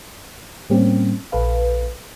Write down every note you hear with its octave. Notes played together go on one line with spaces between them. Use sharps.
A2 G3 A#3 C4 C#4 G4
A#1 A4 B4 F5